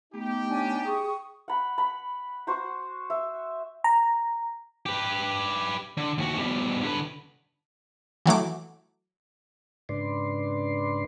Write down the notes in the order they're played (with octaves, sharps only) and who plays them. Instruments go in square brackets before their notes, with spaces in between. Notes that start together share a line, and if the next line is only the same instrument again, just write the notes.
[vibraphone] A3 B3 [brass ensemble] D#4 G4
[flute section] C#4 D4 G#5
[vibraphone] G#4 G5 [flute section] C#6 D#6
[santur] F#5 B5
B5
F#4 C5 C#6
E5
[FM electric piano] A#5
[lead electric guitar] G4 B4
D3
D#2 F#4
B2 G3
D3 B4
[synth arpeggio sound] E3 F#3 A3 D6
[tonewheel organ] G#2 C#3 D4 B4 D5 C6